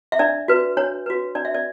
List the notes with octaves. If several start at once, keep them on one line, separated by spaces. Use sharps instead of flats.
E5
D4 D5
F#4 B4
D4 C#5
F#4 B4
D4 D5
E5
D5